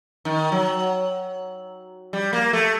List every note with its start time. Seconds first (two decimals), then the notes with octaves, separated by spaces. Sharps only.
0.25 D#3
0.52 F#3
2.13 G3
2.33 A#3
2.53 A3